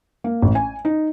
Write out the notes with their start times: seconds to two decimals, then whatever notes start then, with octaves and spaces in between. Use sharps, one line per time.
0.24 A#3
0.42 A1
0.55 G#5
0.85 D#4